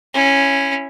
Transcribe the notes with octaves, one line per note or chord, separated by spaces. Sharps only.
C#4 E4